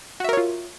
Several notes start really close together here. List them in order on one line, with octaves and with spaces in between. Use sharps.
F#4 E5 A#4 C#5 F4